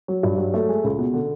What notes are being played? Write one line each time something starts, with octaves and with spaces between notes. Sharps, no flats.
F#3
G2
F#3
A3
G#3
C#2
B2
D3